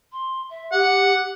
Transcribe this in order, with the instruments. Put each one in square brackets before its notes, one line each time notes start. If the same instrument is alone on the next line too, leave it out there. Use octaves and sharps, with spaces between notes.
[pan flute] C6
E5
[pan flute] G4 [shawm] F#5